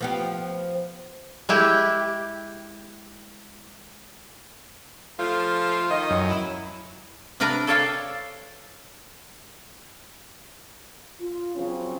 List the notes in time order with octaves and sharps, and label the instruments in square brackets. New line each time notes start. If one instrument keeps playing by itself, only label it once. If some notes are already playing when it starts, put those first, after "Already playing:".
[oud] F3 B3 G4
[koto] G#3 E4 G4
[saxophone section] F3 A3 [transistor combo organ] F4
[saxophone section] D#3 D#5
[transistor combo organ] F#2
[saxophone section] E4
[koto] C3 D4 A#4 B4 A#5
A4 C#5 D5 F5 G5 A5
[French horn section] F4
C#3 F3 F#3 C4 C#4